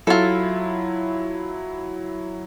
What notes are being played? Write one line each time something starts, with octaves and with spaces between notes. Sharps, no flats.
F#3 E4 F4 A4